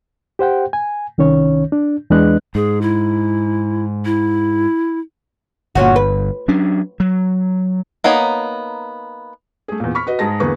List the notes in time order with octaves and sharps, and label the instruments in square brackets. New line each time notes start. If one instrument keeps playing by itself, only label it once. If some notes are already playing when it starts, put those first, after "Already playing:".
[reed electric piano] G4 C5 F#5 G5
G#5
C2 D#3 C#4 C#5
D4
E2 G#3 D4 B4 D#5 F#6
[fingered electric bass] G#2 [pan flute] G#4
[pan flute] E4
E4
[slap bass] G1 G2 [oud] A#2 C#4 F#4
[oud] B4
[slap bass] F#3 C#4 D4
F#3
[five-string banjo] A#3 B3 D#4 C#5
[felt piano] A3 G#4
E2 A#2
B5 C#6 F6 B6
F#4 B4 D#5
G#2 G#3 G#4 A5 A#6
E2 D3 A#3 G#4 B4 C#6